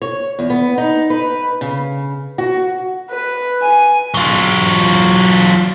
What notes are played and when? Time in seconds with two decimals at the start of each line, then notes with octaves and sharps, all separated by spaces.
0.02 C#5
0.39 E2
0.50 B3
0.78 D#4
1.10 B4
1.61 C#3
2.38 F#4
3.11 B4
3.62 G#5
4.14 F#3 F4